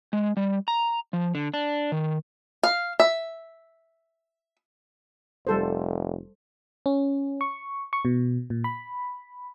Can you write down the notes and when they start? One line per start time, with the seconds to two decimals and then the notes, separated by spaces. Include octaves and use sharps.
0.13 G#3
0.37 G3
0.68 A#5
1.13 F3
1.35 D3
1.54 D4
1.92 D#3
2.63 F5
3.00 E5
5.47 F1 G3 A4 C5
6.86 C#4
7.41 C#6
7.93 C#6
8.05 B2
8.50 A#2
8.64 B5